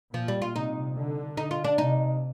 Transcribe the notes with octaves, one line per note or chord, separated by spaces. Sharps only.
A#2 F3
G3
F4
C3 D#4
D3
D#4
F4
D4
C3 D#4